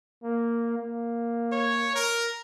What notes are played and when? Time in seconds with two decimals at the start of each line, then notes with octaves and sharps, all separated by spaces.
0.23 A#3
0.78 A#3
1.52 C#5
1.95 A#4